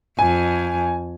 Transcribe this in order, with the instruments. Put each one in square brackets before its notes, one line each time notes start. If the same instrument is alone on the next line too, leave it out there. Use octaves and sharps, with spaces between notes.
[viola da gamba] F2 [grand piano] G#5